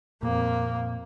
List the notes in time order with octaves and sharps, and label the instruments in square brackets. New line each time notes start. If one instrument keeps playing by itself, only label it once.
[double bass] F2 A#3 [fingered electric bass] A#2